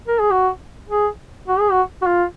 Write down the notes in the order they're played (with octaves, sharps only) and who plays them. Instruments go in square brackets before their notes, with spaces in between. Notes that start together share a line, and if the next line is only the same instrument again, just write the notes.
[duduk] A#4
G#4
F#4
G#4
F#4
G#4
F#4
F#4
F4